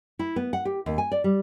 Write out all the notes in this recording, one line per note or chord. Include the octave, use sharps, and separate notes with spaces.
E4
B3
F#5
G4
D#2
G#5
D5
G3